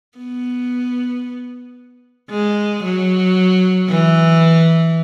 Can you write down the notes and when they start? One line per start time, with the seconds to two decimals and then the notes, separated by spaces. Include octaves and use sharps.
0.18 B3
2.31 G#3
2.84 F#3
3.89 E3